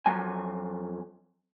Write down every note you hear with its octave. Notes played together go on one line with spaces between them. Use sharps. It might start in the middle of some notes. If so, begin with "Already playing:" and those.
F2 F#3 G#5